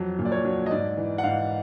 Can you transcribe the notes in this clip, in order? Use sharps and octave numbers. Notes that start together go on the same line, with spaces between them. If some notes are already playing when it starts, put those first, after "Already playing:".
Already playing: F2 F#3
A#2
D5
C#5
F#3
D#5
G#2 D5
E3
F#5
G#2 F5